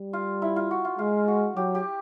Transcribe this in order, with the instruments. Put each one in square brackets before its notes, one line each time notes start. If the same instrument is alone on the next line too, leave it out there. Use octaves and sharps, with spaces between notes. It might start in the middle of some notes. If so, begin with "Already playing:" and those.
Already playing: [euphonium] G3
[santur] F4
E4
F4
F#4
F4
[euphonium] G#3 [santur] F4
[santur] F#4
[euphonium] F#3 [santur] G4
[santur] G4